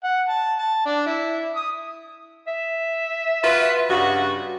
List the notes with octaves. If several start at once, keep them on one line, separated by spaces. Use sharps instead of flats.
F#5
A5
A5
D4
E4
D#6
E5
F4 F#4 B4
G2 C#3 F#4